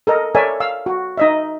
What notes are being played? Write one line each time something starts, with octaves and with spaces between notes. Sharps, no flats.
A4 A#4 D#5
A4 A#4 C#5 D5 E5 G#5
F5 E6
F#4
D#4 D#5 E5